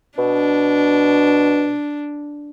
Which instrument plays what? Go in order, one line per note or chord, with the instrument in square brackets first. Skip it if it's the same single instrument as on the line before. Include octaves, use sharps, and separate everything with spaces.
[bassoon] B2 [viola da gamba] D4